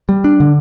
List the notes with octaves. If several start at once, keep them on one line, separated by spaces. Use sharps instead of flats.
G3
D4
D3